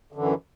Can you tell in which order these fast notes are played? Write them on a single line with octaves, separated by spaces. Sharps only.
D3 F#2 E3